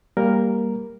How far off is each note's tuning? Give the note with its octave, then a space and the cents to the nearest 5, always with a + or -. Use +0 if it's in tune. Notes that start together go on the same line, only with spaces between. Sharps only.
G3 +10 A#3 +0 A#4 +0